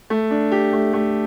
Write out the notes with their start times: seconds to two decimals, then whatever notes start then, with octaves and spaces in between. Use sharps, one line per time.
0.10 A3
0.31 D4
0.52 G4
0.73 A3
0.93 A3